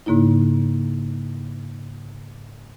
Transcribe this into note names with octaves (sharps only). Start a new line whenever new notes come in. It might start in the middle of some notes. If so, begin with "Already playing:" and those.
G#2 C#3 A#3 D#4 E4